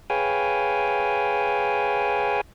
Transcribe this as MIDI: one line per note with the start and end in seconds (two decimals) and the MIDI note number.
0.10 2.41 68
0.10 2.41 71
0.10 2.41 73
0.10 2.41 77
0.10 2.41 79
0.10 2.41 80